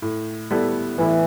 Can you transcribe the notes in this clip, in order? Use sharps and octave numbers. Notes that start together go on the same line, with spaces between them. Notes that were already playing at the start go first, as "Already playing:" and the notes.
A2
G3 B3 E4 A4
A2 E3